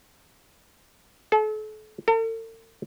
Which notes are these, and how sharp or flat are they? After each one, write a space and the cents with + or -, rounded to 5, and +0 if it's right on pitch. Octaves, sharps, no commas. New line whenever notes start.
A4 -40
A4 +45